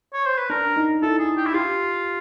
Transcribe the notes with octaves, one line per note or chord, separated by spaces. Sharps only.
C#5
C5
B4
D4 A#4
D#4
E4 A4
G#4
G4
E4
F4 G4